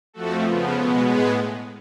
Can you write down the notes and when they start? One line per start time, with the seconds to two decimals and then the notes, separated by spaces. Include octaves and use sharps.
0.13 F2 F3 A3 F#4 A4
0.44 C#3 F3 B3
0.74 B2 G#3 B3 A4 C#5
1.04 A2 G#3 B3 G#4 B4